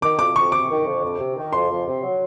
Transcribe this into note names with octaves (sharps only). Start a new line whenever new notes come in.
D#3 D6
F2 D6
F2 C#6
C3 D6
D#3
F2
F2
C3
D#3
F2 C6
F2
C3
F#3